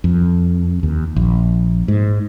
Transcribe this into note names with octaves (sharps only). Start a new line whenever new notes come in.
F2
D#2
A#1
G#2